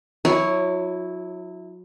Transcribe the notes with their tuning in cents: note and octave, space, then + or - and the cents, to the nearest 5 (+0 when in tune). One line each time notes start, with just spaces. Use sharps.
F#3 -35 E4 -10 C#5 +0